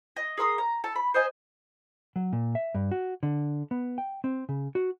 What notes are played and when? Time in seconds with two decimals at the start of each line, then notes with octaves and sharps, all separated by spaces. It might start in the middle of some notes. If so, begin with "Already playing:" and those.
0.16 D#5
0.37 G#4 A#4 C6 D#6
0.58 A#5
0.84 A4 A5
0.96 B5
1.14 C5 D#5 G#5
2.16 F#3
2.33 A#2
2.55 E5
2.74 G2
2.91 F#4
3.23 D3
3.71 B3
3.98 G5
4.24 C4
4.49 C#3
4.75 F#4